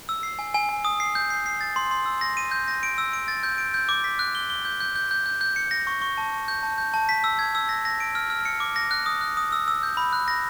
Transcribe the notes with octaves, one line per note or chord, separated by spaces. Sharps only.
E6
C7
G#5
G#5
G#5
D#6
C7
G6
C7
C7
A6
C6
C6
E6
A#6
D#7
G6
A#6
D7
E6
D7
A6
G6
D7
G6
D6
B6
F#6
G7
G7
G6
G6
G6
G6
G6
G6
C#7
A#6
C#6
C#6
A5
C#6
G6
A5
G6
A5
B6
E6
G#6
E6
A#6
A#6
D7
F6
F6
C#7
D6
A#6
F#6
D#6
F#6
D#6
E6
E6
G6
B5
F#6
A#6